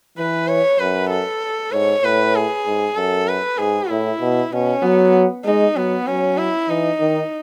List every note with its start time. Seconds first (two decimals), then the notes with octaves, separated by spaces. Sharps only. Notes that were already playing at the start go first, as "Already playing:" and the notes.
0.18 E3 B4
0.48 C#5
0.79 F#2 B4
1.10 A4
1.72 G#2 C#5
2.03 A2 B4
2.35 G#4
2.66 G#2
2.96 F#2 A4
3.28 B4
3.58 G#2 G#4
3.90 A2 E4
4.20 B2
4.52 B2 C#4
4.82 F#3 B3
5.45 G#3 D#4
5.76 F#3 B3
6.07 F#3 C#4
6.38 E4
6.69 E3 D#4
7.00 D#3